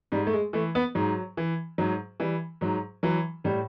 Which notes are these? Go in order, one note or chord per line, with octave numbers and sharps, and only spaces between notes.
G#2 G3
A3
G#3
E3 A3
B3
G#2 F#3
E3
G#2 F#3
E3 G3
G#2 F#3
E3 F#3
A2 G3